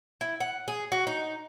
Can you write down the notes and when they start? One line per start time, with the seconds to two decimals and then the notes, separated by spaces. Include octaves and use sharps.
0.21 E4
0.40 F#5
0.68 G#4
0.92 F#4
1.07 D#4